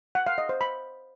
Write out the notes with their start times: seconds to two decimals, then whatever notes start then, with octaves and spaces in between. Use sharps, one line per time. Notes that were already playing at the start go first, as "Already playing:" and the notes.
0.15 F#5
0.27 F5
0.38 D#5
0.49 C5
0.61 B5